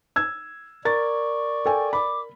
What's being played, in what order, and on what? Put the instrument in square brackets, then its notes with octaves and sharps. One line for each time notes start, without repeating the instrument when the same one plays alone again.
[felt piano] E6 G#6
[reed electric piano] A#4 [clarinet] D5 [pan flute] C#6 [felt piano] A6
[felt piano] A4 G5 G#5
[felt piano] B5 [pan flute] D6